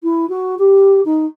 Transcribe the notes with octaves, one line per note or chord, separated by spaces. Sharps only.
E4
F#4
G4
D#4